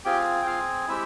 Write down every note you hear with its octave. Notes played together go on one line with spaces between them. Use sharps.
C4 F4 G4 G#4 G5
G5
F4 F5
G#3 C4 E4 G4 E5